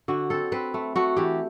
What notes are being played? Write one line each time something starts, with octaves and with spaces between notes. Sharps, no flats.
D3 F#4
C4 A4
C4 B4
A3
A3 F#4
E3 G4